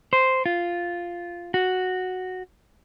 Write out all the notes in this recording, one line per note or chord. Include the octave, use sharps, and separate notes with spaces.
C5
F4
F#4